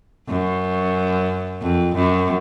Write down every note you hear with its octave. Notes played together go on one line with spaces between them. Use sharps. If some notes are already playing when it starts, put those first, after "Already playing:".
F#2
F2
F#2